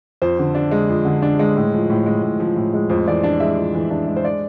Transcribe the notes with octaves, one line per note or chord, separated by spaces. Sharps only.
F2 C5
D3
D4
G#3
F2
D3
D4
G#3
A2
F3
A2
G#3
A2
F3
A2
G#3
F2 C5
E3 D5
D4
G#3 E5
F2
E3
D4
G#3
C5
D5